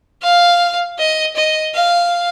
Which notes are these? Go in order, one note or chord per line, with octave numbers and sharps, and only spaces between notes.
F5
D#5
D#5
F5